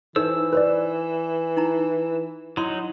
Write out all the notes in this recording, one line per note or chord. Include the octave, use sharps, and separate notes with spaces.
E3 D#4 A4 C5 E6
B4 C5 D5
D#4 E4 A#5
F#3 D#4 E4 C6